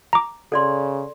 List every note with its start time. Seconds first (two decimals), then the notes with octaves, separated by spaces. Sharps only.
0.13 A#5 D6
0.52 C#3 A4 D5 C6